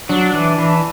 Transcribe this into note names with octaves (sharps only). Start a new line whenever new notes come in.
F#3 D4
E3
E3